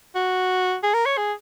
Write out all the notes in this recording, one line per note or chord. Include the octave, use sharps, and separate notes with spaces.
F#4
G#4
A#4
C#5
G#4